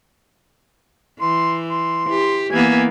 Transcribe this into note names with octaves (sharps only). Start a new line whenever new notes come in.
E3 C6
C6
G4
E3 A#3 B3 G#5